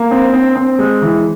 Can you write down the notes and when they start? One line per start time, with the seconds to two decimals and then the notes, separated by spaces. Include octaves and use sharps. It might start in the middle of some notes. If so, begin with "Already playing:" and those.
Already playing: A#3
0.11 C4
0.33 C4
0.56 C4
0.79 G#3
1.02 E3